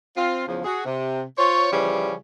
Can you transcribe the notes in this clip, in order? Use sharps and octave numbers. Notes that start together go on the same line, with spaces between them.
C4 F4
E2 C#3 F3
F#4 G#4
C3
F4 C5 C#5
C#3 E3 F3 G3 C#4